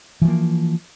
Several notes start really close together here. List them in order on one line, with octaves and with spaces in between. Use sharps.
E3 F3 A#3